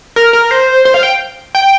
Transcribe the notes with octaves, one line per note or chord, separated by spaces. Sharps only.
A#4
A#4
C5
C5
F5
G5
G5